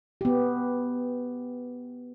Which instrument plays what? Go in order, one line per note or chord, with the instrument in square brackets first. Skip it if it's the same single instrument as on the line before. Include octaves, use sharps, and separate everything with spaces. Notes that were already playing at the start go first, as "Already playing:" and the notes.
[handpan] B3 G4